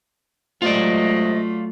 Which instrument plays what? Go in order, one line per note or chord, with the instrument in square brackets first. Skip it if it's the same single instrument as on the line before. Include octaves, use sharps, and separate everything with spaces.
[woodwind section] C3 G#3 D#5 [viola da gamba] F#3 A3 [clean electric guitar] F4 D5